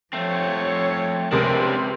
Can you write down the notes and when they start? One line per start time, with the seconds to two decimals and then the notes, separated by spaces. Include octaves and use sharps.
0.13 F3 A3 C4 C#5
1.31 C#2 C3 C4 D4 A#4